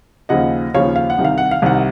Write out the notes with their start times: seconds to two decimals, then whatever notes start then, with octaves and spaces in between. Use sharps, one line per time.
0.29 D#2 C#3 F3 D#5 F#5
0.74 D#2 C#3 F3 C#5 F5
0.96 F5
1.10 F#5
1.18 C2 C3 D#3
1.25 F5
1.38 F#5
1.51 F5
1.62 C2 C3 D#3 F#5